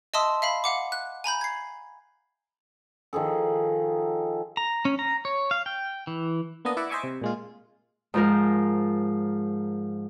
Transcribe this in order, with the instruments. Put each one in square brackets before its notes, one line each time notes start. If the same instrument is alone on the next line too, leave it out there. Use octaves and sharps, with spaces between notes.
[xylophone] D#5 E5 A5 C6 D#6 E6
E5 F5 B5
F5 F#5 D6
F#6
G#5 A#5 B5 G6
G#6 C7
[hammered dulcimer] D#3 F3 G#4 A4
[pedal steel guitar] A#5
C#4
A#5
C#5
F5
G5
E3
[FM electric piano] A#3 B3 D4 D#5
E4 D5 E5 F#5
C5 D#5 E5 G#5 C#6 D6
C3
A#2 G#3 F4
[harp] G#2 F3 A#4